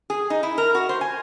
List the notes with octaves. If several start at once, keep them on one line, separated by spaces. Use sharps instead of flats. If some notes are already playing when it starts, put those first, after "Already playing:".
G#4
D#4
E4
A#4
F#4
C5
G#5